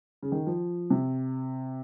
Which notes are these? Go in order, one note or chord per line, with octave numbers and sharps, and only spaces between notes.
C#3
D#3
F3
C3